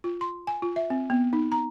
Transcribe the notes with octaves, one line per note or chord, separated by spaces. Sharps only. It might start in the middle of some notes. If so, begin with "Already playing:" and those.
F4
C6
G#5
F4
E5
C4
B3
D#4
A#5